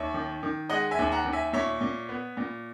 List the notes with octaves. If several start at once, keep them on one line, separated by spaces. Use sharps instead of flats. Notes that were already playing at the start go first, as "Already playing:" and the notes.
Already playing: D#2 C#5 E5
D#3
D#3
G#3 D#5 F#5
E5 G#5
D#2
F#5 A#5
D#2
E5 G#5
A#2 C#5 E5
A#2
B3
A#2